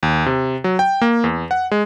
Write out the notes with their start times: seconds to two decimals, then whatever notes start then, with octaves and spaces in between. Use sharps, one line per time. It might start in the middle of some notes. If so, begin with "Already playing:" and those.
0.03 D#2
0.26 C3
0.64 F#3
0.79 G5
1.01 A#3
1.24 E2
1.51 F#5
1.71 G#3